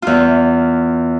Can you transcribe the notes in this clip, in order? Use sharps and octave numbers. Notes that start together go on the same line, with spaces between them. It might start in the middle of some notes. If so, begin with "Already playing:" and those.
E2 F4